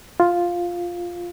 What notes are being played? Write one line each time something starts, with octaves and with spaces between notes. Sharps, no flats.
F4